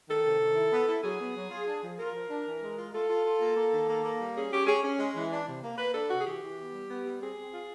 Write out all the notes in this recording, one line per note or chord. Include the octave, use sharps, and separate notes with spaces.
D#3 A4
C3
D#3
E4
B3
E4
F#3 G#4
B3
F#3
F4
D4
F3
F4 A#4
F3
D4
E3
G#3
F4
F4 A4
F4
F4
A#3
A#3
D#3
A#3
A#3
G3
C#4 G#4
C#4 G4
C#4 G#4
C#4
G#3
E3
D4
C3
A#3
A#3 B4
D4 A4
C3 F#4
G#4
E3 G4
E3
B3
G3
B3
G3
C4 G#4
C4
F4